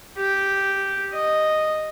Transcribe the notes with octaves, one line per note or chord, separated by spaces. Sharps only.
G4
D#5